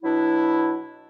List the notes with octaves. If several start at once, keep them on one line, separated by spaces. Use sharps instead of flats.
B2 F#3 D4 E4